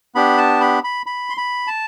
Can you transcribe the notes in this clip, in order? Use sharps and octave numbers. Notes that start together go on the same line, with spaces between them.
B3 D4 G4 B5
A5
B5
B5
B5
C6
B5
A5